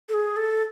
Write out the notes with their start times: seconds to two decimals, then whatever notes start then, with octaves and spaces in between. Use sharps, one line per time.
0.09 A4
0.14 G#4
0.36 A4